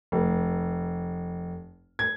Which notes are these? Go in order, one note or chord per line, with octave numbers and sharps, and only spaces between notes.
F1
G#6